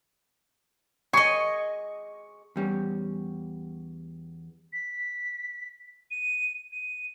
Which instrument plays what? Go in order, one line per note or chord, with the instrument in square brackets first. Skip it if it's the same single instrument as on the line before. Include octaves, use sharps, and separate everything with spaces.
[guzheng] G#4 D#5 [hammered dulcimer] C#6
[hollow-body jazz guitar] E2 G3 C#4
[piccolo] B6
D#7
D#7